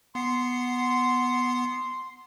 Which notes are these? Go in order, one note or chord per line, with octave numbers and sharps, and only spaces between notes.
B3 F#5 C6 C7